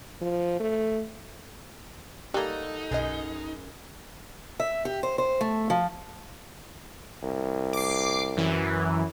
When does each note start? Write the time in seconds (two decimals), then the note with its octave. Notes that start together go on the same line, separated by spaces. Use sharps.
0.21 F3
0.60 A3
2.34 G3 A#3 D#4 F#4 A4 D#5
2.91 B1 F#2 G#4 D#5
4.60 E5
4.85 G4
5.03 C5
5.18 C5
5.41 A3
5.70 F3
7.23 C2
7.73 D6 C7
8.37 F#2 E3